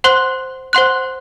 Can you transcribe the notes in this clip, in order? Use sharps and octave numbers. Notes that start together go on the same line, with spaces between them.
C5 F#5 C6 F#6
C5 F#5 C6 F#6